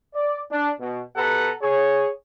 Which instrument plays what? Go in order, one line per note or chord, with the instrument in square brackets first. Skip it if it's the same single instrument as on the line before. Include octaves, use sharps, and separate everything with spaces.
[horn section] D5
D4
B2
B2 G4 A4 B4 F#5 A#5
G#4 C#5